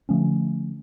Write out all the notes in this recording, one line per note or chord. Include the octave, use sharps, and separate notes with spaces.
D3 F3 A3 C#4